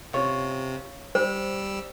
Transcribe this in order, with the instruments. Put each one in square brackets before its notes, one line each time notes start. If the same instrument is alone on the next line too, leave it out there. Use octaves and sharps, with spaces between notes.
[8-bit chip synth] C3 [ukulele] C#4 F4 C#5
[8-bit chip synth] G3 E6 [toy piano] C5